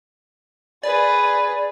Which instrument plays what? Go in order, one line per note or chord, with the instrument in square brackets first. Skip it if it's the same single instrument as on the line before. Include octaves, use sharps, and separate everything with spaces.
[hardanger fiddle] G#4 B4 [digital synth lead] D5